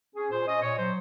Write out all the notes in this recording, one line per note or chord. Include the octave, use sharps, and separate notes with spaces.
C#4 G#4
A#2 C5
C#4 D#5
A#2 C#5
F#3 C5